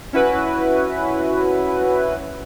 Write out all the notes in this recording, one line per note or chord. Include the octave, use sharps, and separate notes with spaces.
C#4 E4 F#4 B4